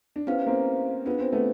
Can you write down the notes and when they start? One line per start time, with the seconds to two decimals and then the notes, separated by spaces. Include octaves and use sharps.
0.16 D4
0.27 B3 C#4 E4 G4 C5 F5
0.47 A#3 C4
1.06 B3 D4 F4 G#4
1.19 C4
1.33 A3 B3